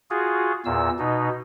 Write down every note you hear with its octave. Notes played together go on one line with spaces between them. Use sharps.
F4 F#4 G#4
E2 A#2 E6
B2 D#4